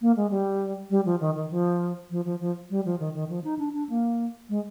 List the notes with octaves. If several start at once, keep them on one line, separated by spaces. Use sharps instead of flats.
A#3
G#3
G3
G3
F3
D#3
D#3
F3
F3
F3
F3
G3
F3
D#3
D#3
F3
D#4
D4
D4
A#3
G#3